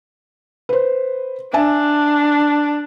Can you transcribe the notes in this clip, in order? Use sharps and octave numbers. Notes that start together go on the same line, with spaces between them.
B4 C5
D4 E5 G#5 A5